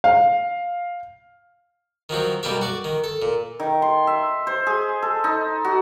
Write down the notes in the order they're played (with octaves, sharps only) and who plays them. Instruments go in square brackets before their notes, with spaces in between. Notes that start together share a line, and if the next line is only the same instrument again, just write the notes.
[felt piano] F5
[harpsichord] D#3 F3 F#3 C4
B1 B2 G3 A#3 G4 E5
F#4 D5
D#3
A4
A#2
[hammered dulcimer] D#3
C6
E5
C5
G#4
A4
D#4
F#4